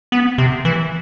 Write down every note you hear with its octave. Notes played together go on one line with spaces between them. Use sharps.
B3
C3
E3